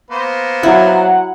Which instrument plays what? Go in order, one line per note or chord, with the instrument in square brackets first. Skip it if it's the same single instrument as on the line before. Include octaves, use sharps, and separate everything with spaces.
[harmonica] A#3 B3 C5
[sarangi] F#3 [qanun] E4 [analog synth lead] F#5